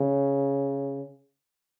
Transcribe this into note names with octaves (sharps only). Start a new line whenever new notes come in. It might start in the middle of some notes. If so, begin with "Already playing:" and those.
Already playing: C#3